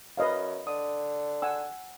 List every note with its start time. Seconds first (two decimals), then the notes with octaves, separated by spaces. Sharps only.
0.17 F#2 B4 D#5 F5
0.67 D3 D#6
1.42 F#5 G#5 E6